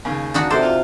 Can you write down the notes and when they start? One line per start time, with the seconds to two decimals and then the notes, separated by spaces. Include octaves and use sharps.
0.05 D#2 C#3
0.34 D4 D#4 F#4
0.50 C3 A4 C5 D5
0.63 F4